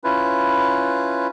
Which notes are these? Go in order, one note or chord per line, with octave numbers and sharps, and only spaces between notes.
C#4 E4 F4 B4